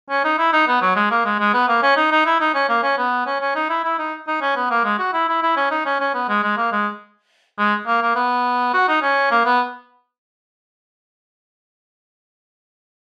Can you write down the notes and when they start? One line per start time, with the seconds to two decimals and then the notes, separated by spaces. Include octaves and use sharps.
0.10 C#4
0.24 D#4
0.38 E4
0.53 D#4
0.68 B3
0.82 F#3
0.96 G#3
1.11 A#3
1.25 G#3
1.39 G#3
1.54 B3
1.68 A#3
1.82 C#4
1.97 D#4
2.12 D#4
2.26 E4
2.40 D#4
2.54 C#4
2.69 A#3
2.83 C#4
2.98 B3
3.27 C#4
3.41 C#4
3.55 D#4
3.69 E4
3.84 E4
3.99 D#4
4.28 D#4
4.42 C#4
4.56 B3
4.70 A#3
4.85 G#3
4.99 F#4
5.13 E4
5.28 E4
5.43 E4
5.57 C#4
5.71 D#4
5.86 C#4
6.00 C#4
6.14 B3
6.29 G#3
6.43 G#3
6.57 A#3
6.72 G#3
7.59 G#3
7.87 A#3
8.02 A#3
8.16 B3
8.74 F#4
8.88 D#4
9.02 C#4
9.31 A#3
9.45 B3